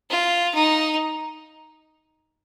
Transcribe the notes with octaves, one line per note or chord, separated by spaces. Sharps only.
F4
D#4